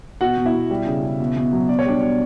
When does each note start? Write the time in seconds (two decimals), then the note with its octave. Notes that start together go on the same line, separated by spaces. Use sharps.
0.21 B2 F#4 F#5
0.37 B2
0.46 E4 E5
0.54 B2
0.70 G3
0.87 C#3
1.03 C#3
1.20 B2
1.36 B2
1.52 F#3
1.69 B2 D5
1.79 C#5
1.85 G3 D4 D5
2.02 B2